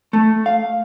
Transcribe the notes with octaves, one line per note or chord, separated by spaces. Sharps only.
A3
F5